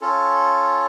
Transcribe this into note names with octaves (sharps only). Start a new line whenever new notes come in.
C#4 F4 A4